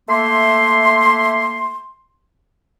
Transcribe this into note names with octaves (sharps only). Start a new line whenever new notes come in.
A3 A#3 E5 C6